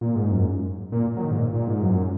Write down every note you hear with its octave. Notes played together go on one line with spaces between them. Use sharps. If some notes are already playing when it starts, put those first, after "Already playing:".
A#2
G#2
F#2
A#2
F#3
D#3
G#2
A#2
A#2
G#2
F#2